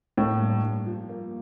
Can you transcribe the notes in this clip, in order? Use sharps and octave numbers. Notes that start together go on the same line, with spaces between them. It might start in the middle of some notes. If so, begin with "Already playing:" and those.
A2 A#3
G2
G2
F3
A#3